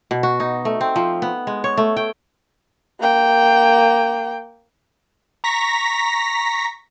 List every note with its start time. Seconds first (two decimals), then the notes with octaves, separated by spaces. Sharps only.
0.11 B2
0.23 F#4
0.40 D#4
0.65 A3
0.81 C4
0.96 F3
1.22 B3
1.47 G#3
1.64 C#5
1.77 A3
1.97 G5
3.00 A#3 G5
5.44 A#5 C#6 A#6 B6